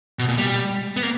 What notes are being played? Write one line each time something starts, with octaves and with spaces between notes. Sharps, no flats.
B2
A#2
G3
B3
A#3